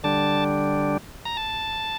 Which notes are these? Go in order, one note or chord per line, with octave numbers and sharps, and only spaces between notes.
D3 G3 D4 A5
A#5
A5